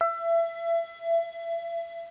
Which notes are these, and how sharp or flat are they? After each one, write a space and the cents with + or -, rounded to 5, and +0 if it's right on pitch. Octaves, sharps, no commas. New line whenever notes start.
E5 +30